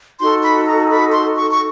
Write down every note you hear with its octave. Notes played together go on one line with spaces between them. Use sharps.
D#4 F#4 A4 C6
B5
A#5
B5
C6
C#6
C#6